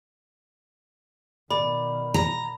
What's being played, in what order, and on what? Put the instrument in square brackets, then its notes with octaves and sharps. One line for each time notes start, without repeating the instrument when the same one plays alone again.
[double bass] B2 D#3 [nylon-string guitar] D5 [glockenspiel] B5
[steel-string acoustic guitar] A#5